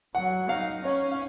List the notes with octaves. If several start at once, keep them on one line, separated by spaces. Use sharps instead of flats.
F#3 F#5
D#4 F5
C#4 C#5
F5